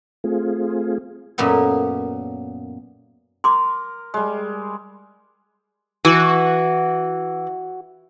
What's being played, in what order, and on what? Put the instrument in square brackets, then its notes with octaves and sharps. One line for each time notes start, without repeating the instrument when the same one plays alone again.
[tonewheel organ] A3 C4 F4 G#4
[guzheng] F#2 A#2 A#3 B3 A4
[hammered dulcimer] A#4 [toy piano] C6 D6
[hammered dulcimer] G3 G#3
[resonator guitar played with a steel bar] E3 [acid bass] F#4